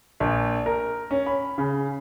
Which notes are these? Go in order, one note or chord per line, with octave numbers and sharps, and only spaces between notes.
A#1
A#4
C#4
B5
C#3